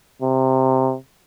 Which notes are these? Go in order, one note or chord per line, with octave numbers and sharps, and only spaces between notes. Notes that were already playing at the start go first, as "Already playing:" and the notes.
C3